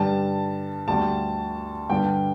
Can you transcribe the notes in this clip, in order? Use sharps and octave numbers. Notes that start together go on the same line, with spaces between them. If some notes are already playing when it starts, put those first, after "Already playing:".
Already playing: G2 D3 G3 A5
D2 D3 G3 A5
G2 D3 G3 G5